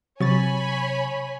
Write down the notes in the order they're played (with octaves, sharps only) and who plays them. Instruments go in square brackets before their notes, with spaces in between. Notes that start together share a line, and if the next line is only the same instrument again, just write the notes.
[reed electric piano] C3 [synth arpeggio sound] F#3 C#6 A6 [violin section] C#5 G#5 B5